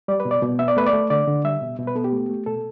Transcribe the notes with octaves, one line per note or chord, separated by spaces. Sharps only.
G3 D5
B4
B2
D5
B2
B3 E5
D5
A3 B4
D5
A3
D3 D5
D3
G3 E5
B2
B2
B4
B3 A4
G4
A3
A3
B2 A4